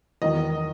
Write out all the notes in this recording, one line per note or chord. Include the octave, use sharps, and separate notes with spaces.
E2 D#3 F#3 D#5